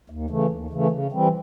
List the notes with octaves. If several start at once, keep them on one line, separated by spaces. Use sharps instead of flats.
D#2
C#3 E3 A3
D#2
C#3 E3 A3
C#3
E3 G3 C4